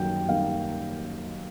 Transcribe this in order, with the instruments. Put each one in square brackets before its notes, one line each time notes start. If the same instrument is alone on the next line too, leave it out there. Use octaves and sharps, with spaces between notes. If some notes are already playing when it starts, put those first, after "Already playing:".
Already playing: [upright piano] F#2 D#3 G3 A#3 G5
D#3 G3 A#3 F5